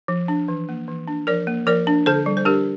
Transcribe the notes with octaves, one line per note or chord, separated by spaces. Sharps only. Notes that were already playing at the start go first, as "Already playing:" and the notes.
F3
D4
E3
A#3
E3
D4
F3 A#4 D5
A#3
F3 A#4 D5
D4
D3 A4 C5
G3
C5
D4 G4 A#4